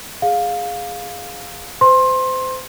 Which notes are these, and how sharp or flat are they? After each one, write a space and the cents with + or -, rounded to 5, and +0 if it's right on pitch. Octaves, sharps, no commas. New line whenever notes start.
G#4 +0 F5 +15
C5 -30 C6 +20